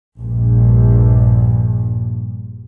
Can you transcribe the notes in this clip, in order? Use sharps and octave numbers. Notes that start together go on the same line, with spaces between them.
A#1 G2